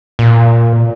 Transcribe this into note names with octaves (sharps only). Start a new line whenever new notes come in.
A#2